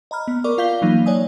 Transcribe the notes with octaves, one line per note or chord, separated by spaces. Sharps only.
D#5 A#5 B5 F6
B3
A#4 D5 C#6 D6
F4 F5 G6 B6 G7
E3 F#3 A#3 D#4
C#5 D5 G#5 D#6